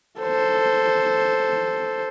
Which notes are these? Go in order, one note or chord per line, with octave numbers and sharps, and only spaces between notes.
A4 C5